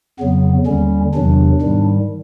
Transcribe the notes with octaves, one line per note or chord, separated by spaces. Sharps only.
F2 C#3 F#3 B3
D#2 D3 G3 C#4
E2 C3 D#3 F#3 D4
G#2 D#3 G3